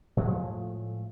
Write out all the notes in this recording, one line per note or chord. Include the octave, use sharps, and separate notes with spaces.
A2 F3 G#3 A3